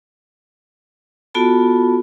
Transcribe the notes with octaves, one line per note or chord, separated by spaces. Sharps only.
B3 F4 F#4 A4 A5 B5